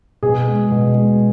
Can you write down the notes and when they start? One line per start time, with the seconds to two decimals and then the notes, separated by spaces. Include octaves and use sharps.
0.23 B2 G#4
0.47 G#3
0.71 B2
0.95 G#3